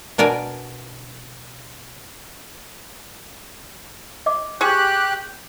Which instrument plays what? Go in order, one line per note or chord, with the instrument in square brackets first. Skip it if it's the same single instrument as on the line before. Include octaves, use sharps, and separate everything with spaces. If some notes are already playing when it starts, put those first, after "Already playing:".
[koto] B2 D4 A#4 D5 G#5
[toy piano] D#5 D6
[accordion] G4 F#6 [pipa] G#4 C#6 [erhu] G5